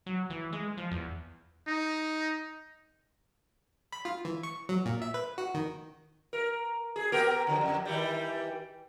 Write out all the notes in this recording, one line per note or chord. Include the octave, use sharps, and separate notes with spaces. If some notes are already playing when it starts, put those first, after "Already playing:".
F#3
E3
G#3
F3
E2
D#4
B5
F4
E3
C#6
F#3
A#2
E5
B4
F#4
D#3
A#4
G#4
B3 G4 A#4
D3 F3
F2
D#3 E3 G3